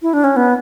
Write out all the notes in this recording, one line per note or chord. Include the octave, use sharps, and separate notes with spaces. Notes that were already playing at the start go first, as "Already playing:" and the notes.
E4
D4
C#4
B3